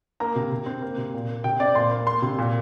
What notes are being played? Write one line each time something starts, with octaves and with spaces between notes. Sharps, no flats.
A#3 A#5
C3
C3
C4
A#3
C3
A#2
A#3
C3 G5
C4 D5
A#2 C6
A#3
A#3 C6
C3
A#2